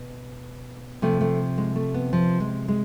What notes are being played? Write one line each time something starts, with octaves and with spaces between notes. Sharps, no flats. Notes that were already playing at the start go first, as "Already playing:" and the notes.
Already playing: B2
C3 F3 A3
A3
G#3
A3
B3
F3
G#3
G#3